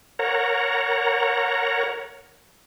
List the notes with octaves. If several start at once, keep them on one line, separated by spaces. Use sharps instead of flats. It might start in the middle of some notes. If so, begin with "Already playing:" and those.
A#4 C#5 F#5 A#5